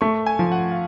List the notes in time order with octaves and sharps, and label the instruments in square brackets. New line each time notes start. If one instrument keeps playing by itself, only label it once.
[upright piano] A3 [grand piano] C#6
[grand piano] G#5
[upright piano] F3
[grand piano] F#5
F5